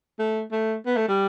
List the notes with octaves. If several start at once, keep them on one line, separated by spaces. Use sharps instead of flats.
A3
A3
B3
A3
G3